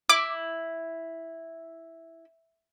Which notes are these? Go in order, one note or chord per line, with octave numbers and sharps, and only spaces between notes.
E4 D6